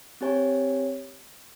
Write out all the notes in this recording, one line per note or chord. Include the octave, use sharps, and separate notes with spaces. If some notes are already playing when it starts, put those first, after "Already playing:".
C4 G4 C#5 G#5